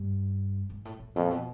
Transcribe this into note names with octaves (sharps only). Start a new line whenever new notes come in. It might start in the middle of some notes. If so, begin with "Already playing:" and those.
Already playing: G2
G#2
A2
A2
F2 A#2
B2